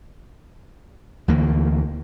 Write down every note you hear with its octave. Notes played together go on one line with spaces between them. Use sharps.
D2 E3 A#3